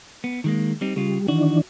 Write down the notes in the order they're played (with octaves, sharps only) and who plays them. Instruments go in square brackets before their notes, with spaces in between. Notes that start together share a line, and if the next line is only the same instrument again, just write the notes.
[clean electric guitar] B3
D#3 G#3 A#3
G3 C4 D#4
[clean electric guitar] C#3 F4 [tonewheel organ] G3
[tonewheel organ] D#3 E3 D4 [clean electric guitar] F#4